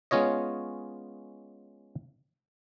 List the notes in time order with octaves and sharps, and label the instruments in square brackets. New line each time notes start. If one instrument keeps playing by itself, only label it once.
[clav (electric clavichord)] G#3 B3 C#4 F4 C#5 D#5